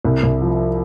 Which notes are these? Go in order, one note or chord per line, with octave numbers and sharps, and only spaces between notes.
C2
C2
F3